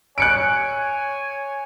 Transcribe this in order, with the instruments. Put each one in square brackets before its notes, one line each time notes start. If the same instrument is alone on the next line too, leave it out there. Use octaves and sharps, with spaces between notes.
[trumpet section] C#5 G#5 [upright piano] F#6 C#7 D7